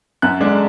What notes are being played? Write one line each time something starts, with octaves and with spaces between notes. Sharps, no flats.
F#2 F#6
D3 G#3 D4